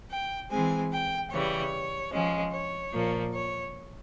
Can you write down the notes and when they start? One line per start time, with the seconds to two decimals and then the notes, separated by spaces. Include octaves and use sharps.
0.10 G5
0.50 E3 G#3 C4 G#5
0.91 G5
1.30 C#3 E3 G3 C#5
2.12 F3 G#3 C#4
2.52 C#5
2.92 A#2 F3 A#3
3.33 C#5